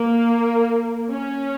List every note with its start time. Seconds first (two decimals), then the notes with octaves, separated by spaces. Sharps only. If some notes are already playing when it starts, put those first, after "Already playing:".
Already playing: A#3
1.11 C#4